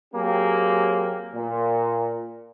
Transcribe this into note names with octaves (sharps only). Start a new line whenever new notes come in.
F#3 A#3 C4 G4 G#4
A#2